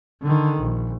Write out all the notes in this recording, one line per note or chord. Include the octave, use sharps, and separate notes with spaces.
D3 D#3
A#1